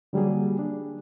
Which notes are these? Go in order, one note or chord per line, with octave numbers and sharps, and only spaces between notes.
D3 F#3 G3 A#3 G#4
D4